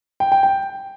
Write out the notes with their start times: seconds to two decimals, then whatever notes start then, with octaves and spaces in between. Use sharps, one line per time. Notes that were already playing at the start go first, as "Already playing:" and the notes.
0.20 G5
0.32 G5
0.43 G5